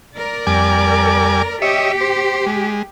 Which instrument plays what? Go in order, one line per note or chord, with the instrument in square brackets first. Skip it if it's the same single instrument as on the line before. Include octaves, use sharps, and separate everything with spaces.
[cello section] A#4 D5
[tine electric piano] F2 [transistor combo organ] G3 G#5 D6
[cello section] G4 [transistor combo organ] C#5 D#5 E5 [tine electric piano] C#7
[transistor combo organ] C5
G#3